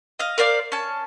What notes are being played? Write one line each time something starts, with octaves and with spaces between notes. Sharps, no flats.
D#5 F5
A#4 C5 D5 F5
C#4 A5